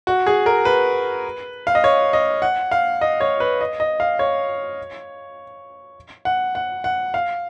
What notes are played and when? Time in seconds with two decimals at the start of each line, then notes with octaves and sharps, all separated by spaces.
0.07 F#4
0.26 G#4
0.46 A#4
0.65 B4
1.67 F5
1.75 D#5
1.84 C#5
2.13 D#5
2.42 F#5
2.71 F5
3.01 D#5
3.20 C#5
3.40 B4
3.61 D#5
3.80 D#5
4.00 F5
4.19 C#5
6.25 F#5
6.55 F#5
6.84 F#5
7.14 F5